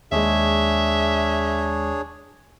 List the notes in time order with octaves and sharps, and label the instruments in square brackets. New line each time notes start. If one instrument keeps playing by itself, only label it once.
[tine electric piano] D#2 G#3 [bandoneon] D4 G#4 C#5 [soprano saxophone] E5